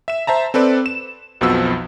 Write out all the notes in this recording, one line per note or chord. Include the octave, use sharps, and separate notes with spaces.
E5 E7
C5 E5 A5 A#5
C4 A4 B4 D5
E7
B1 F2 F3 B3 F#4 E6